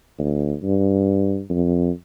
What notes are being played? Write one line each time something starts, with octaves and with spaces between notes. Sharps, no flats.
D2
G2
F2